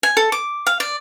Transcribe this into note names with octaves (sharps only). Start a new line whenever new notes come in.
G#5
A4
D6
F5
D5